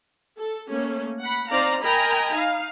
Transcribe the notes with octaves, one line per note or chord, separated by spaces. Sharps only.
A4
A3 A#3 C#4
F#5 B5
C4 D#4 C5 D5 F5 A#5
A#4 D#5 G5 G#5 A#5 B5
D#4 F5